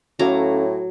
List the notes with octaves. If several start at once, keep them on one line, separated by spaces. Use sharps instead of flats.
A2 F#3 C#4 A4 F5 A#5 D6